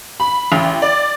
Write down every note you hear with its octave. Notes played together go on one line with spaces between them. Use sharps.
B5
A1
D5